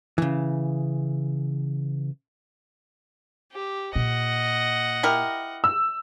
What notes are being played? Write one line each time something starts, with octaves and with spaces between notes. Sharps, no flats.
C#3 E3
G4
A#2 D#5 F#5
E4 G4 A#4
E6